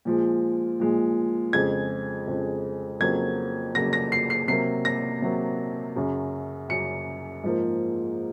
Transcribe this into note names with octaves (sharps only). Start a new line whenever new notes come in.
A#2 F3 G#3
A#2 F3 G#3
F2 C#3 G#3 G#6
F2 C#3 G#3
F2 C#3 F#3 A#3 G#6
F2 C#3 F#3 A#3 A#6
A#6
C7
C7
C3 F#3 A#3 C7
A#6
C3 F#3 A#3
F#2 C#3 F#3
F#2 C#3 F#3 C#7
G#2 F3 A#3